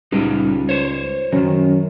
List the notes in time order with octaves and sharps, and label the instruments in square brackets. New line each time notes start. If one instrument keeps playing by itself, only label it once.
[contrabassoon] C#2 [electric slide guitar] G3 D#4 G4
[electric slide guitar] C5 C#5
[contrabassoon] F#2 [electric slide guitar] D#3 E3